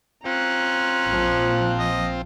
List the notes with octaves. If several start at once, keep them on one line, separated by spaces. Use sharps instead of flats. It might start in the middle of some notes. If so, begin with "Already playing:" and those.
C4 C#4 F4 A#5 F#6
A#1 F3
D#5